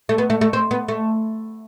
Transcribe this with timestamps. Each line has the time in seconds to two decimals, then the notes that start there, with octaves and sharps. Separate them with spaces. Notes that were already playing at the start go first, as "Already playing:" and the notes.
0.09 A3
0.18 B3
0.30 A3
0.41 A3
0.53 C4
0.71 B3
0.88 A3